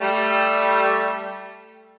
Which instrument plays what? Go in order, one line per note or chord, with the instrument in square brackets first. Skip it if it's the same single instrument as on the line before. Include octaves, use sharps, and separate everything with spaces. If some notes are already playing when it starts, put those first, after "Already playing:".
[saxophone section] G3 A3